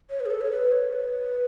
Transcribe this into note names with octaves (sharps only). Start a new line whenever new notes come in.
C#5
B4
G#4
A4
C#5
B4
C#5
B4